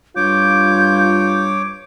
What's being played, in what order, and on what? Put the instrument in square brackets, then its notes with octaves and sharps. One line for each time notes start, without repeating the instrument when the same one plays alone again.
[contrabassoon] G2 [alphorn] F4 [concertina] C#5 D6 [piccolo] G6